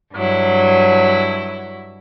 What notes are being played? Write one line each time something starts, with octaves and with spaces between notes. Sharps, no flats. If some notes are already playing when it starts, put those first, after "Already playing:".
G2 F#3 E4